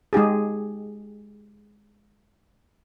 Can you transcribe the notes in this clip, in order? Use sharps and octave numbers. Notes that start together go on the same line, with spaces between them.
G#3 D#4 G4 G#4